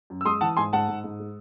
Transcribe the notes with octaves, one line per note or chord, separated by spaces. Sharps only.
F#2
E6
G#3 C6 D#6
E3 F#5 A5
G#2 G#5 C6
G#2 F#5 A5
G#2
G#2
G#3